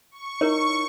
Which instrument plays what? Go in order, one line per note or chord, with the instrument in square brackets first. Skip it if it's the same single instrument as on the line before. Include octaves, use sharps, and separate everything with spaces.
[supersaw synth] C#6
[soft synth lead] D#4 [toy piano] E4 A#4 C#5